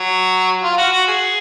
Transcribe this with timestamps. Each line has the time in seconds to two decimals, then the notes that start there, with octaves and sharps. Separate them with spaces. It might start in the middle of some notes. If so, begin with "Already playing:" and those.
Already playing: F#3
0.63 F4
0.78 F#4
0.92 F#4
1.08 G#4